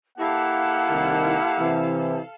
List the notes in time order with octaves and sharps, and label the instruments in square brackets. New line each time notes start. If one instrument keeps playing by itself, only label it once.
[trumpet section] A#3 F#5 [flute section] E4 G4 A5 [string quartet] A4 F5
[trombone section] C2 D#3
C3 E3